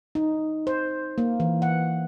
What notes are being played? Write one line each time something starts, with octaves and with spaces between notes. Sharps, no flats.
D#4
C5
A#3
E3
F#5